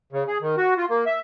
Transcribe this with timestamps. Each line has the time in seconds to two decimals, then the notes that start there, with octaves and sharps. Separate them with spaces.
0.12 C#3
0.27 G#4
0.41 D#3
0.57 F#4
0.77 F4
0.90 A#3
1.06 E5